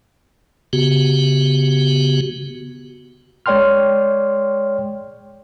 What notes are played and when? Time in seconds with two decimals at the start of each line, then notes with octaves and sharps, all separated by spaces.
0.73 C#3 B3 F#4 G4
3.46 G#3 C#5 D5 G5 C6 F6